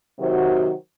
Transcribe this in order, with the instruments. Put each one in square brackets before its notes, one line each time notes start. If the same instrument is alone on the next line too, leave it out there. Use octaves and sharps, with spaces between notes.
[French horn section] C3 D#3 F#3 F#4 C5